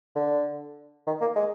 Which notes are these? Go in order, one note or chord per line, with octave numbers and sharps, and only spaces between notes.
D3
D#3
A#3
G#3